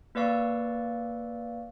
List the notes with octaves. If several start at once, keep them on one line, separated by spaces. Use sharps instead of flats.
A#3 B4 D5 F5 C#6 E6